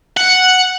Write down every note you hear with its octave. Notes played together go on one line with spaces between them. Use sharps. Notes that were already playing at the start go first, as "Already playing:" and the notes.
F#5